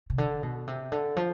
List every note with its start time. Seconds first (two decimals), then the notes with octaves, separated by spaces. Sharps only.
0.10 C3
0.18 D3
0.43 B2
0.67 C3
0.92 D3
1.16 F3